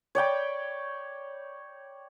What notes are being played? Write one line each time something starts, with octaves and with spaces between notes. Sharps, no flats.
C#5 D5 G5 B5